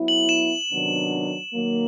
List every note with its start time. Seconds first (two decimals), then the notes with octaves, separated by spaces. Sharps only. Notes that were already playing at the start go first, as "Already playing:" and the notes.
Already playing: F#3 B3 E4
0.08 F#7
0.29 E7
0.70 C3 D#3 F#3 B3 D4
1.53 D#3 F#3 A#3